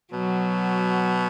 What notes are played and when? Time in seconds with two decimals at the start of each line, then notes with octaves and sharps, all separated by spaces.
0.12 B2 F#3